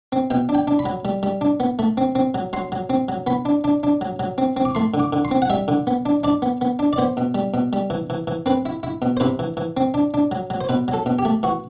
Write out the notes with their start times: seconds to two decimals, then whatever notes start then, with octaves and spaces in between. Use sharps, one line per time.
0.12 C4
0.30 B2 G5
0.49 D4
0.55 G5
0.67 D4
0.79 B5
0.86 F#3
1.05 G3
1.23 G3
1.41 D4
1.60 B3
1.79 A3
1.97 C4
2.15 C4
2.34 F#3
2.53 F#3 C6
2.72 F#3
2.90 C4
3.08 F#3
3.27 B3 B5
3.45 D4
3.64 D4
3.83 D4
4.01 F#3
4.19 F#3
4.38 C4
4.57 C4
4.65 D6
4.75 A3 C6
4.94 D3
5.00 D6
5.13 D3
5.25 C6
5.31 C4
5.42 F#5
5.50 G3 E5
5.68 D3
5.87 B3
6.06 D4
6.24 D4 D5
6.42 B3
6.61 B3
6.79 D4
6.93 D5
6.98 B3 C5
7.17 B2
7.35 G3
7.54 B2
7.73 G3
7.90 E3
8.10 E3
8.27 E3
8.46 C4 B4
8.66 E4
8.83 E4
9.02 B2
9.17 C5
9.20 C3 B4
9.39 E3
9.57 E3
9.77 C4
9.94 D4
10.14 D4
10.32 F#3
10.50 F#3
10.61 C5
10.69 B2 B4
10.88 F#3
10.93 A4
11.06 B2
11.19 G4
11.25 A3
11.43 E3 F#4